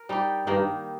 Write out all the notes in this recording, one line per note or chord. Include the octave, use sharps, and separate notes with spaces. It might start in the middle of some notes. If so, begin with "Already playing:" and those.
Already playing: A#4
G3 D#4 G4
G2 D#3 A#3 D#4